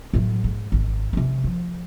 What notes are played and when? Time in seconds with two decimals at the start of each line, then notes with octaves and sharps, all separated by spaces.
0.13 A2 F#3
0.44 G#2
0.72 G#1 C4
1.13 C3 C#4
1.44 F3